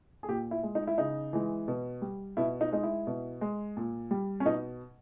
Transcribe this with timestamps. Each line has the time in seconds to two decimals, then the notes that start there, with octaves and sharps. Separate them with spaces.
0.23 G#4
0.28 A#2 G4
0.51 E4
0.63 G#3
0.75 D#4
0.87 E4
0.98 C#3 D#4
1.33 E3 G#3
1.68 B2
2.02 G3
2.37 B2 E4
2.61 D#4
2.72 G#3 D#4
2.83 E4
3.07 B2
3.41 G#3
3.77 A#2
4.11 G3
4.40 C#4
4.45 B2 D#4